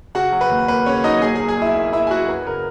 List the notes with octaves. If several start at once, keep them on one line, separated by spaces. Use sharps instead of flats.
C#3 F#4 F#5
F#3
B4
D#2
A#3 B4
C#3 C#4 C#5
F#3 D#4 D#5
A#2 G#4 G#5
G#4 G#5
F#3
G#4 G#5
B1
E4 E5
A#3
A#2 E4 E5
G#5
F#3 F#4 F#5
F#2 B4
C#3 A#4